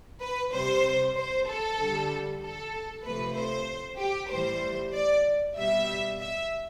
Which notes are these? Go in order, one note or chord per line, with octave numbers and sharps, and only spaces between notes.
B4
C3 G3 C5
C5
A4
D3 G3
A4
C3 F3 A3 B4
C5
G4
A2 E3 G3 C5
D5
B2 G3 E5
E5